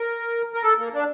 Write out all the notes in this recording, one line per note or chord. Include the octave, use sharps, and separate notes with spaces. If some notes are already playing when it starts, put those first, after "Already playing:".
Already playing: A#4
A#4
A4
A#3
D4